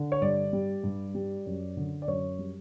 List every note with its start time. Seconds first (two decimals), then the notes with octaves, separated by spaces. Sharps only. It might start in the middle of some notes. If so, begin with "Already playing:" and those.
Already playing: D3
0.12 C#5
0.22 G2 D5
0.53 G3
0.84 G2
1.15 G3
1.46 F#2
1.77 D3
2.02 D5
2.08 F#2 C#5
2.39 G3